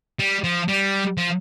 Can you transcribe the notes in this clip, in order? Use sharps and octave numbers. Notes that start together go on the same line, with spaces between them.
G3
F3
G3
F3